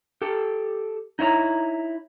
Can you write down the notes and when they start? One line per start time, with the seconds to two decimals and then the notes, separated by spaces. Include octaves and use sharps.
0.22 G4 A4
1.19 D#4 E4 C#5 A#5